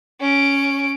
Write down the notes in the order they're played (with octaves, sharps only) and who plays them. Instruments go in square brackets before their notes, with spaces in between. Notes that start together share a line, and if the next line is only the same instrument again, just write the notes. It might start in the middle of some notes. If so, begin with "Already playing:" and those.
[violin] C#4 D7